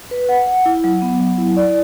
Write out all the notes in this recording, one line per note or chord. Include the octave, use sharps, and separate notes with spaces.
B4
F#5
F#5
E4
F#3
B3
F#3
E4
D5